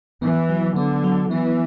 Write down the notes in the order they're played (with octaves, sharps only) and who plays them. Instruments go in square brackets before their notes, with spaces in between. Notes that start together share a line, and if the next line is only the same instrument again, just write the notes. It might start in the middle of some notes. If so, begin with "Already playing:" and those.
[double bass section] E3 [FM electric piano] B3
[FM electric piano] F#3
[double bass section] D3 [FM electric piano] B3
[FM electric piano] F#3
[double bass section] E3 [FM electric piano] B3